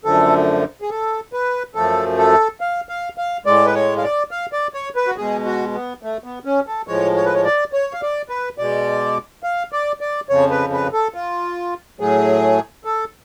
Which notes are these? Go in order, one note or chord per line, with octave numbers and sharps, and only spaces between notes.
F#2 D3 F3 A3 A4
G#4
A4
B4
F#2 F3 A3 A4
A4
F5
F5
F5
A2 G#3 D5
B4
C#5
F5
D5
F5
D5
C#5
B4
F#4
B2 G#3 G#4
F#4
B3
A3
B3
C#4
A4
A2 F3 G#3 C#5
C#5
B4
C#5
D5
C#5
F5
D5
B4
B2 G#3 D5
F5
D5
D5
F2 C#3 F3 C#5
B4
B4
A4
F4
A2 F#3 A3 G#4
A4